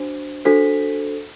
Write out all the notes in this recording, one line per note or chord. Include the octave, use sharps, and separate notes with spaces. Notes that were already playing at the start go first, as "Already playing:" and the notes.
Already playing: D4 F#4 C5
D4 F#4 A4 C5 B6